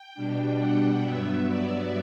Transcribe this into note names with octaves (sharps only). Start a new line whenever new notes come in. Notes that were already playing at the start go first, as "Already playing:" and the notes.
Already playing: G5
B2 G3 D4
F#5
G2 F#3 B3 E5
D5